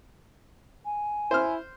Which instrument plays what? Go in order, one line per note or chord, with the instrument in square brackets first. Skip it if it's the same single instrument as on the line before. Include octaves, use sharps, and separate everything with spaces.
[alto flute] G#5
[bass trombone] E4 [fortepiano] C5 F6